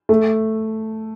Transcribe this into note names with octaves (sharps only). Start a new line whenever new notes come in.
A3